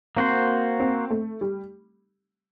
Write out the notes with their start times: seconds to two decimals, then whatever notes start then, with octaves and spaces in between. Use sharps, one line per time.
0.17 A#3 C4 F#4 C5
0.80 C4
1.10 A3
1.41 G3